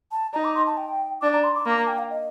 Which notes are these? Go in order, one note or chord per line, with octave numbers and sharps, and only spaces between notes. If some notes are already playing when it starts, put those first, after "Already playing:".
A5
D#4 A#5
D6
C6
A5
G5
D4 D6
A#5
C6
D6
A#3 A#5
A#5
G5
F5
D#5